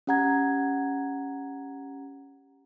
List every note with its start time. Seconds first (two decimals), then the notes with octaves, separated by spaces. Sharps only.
0.07 C#4 G4 F#5 A#5 G#6